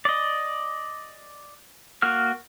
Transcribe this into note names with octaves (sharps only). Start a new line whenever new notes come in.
D5 D#5
A#3 F#4 F6